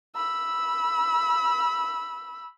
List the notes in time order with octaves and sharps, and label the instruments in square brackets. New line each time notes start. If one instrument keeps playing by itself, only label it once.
[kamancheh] B5 E6